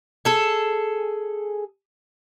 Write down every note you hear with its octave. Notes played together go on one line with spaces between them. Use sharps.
G#4 A4